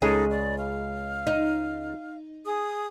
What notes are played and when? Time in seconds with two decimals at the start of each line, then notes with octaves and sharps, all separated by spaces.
0.02 C#2 C#3 G#3 D#4 G#4 A4
0.30 D5
0.56 F5
1.27 D#4
2.45 G#4 D#6